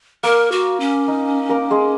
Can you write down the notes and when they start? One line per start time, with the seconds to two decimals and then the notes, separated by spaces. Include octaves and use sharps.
0.23 A#3 A#4
0.52 F#4
0.80 C#4
1.08 D#4
1.49 A#3 A#4
1.71 G#3 G#4